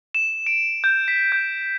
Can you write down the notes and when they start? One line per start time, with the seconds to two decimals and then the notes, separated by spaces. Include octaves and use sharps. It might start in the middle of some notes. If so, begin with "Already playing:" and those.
0.15 E7
0.47 D7
0.84 G6
1.08 B6
1.32 G6